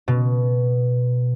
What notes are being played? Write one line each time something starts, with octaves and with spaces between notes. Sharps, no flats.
B2